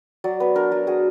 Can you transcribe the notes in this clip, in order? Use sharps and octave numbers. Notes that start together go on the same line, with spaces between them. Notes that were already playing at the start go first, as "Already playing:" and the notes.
F#3 D5
B3 B4
D4 A#4
F#3
F#3 G#4